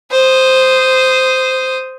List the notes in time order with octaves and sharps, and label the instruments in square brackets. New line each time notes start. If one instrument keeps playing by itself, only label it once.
[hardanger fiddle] C5 D#6